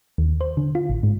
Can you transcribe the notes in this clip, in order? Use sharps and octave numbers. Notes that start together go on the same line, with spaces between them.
D#2
C5
D3
F4
A1
G#2